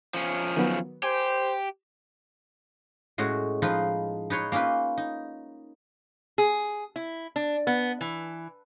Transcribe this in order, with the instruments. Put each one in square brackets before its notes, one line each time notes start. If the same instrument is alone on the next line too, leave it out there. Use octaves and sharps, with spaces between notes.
[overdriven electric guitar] F3 C#4
[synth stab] D#3 F#3 B3
[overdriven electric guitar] G4 [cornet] C5 [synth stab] G#5
[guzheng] A2 G#3 C#4 F#4
F3 D#4 F4 B4
D#4 B4 C#5 C6
A#3 C#4 D#4 F4 B4
D#4
[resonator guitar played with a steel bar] G#4
E4
D4
B3
E3